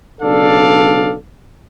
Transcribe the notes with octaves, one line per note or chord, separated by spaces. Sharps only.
B1 C#3 D4 A4 D5 F5